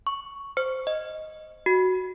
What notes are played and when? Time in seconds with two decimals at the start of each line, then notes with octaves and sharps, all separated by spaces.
0.07 C#6
0.57 C5
0.87 D#5
1.66 F#4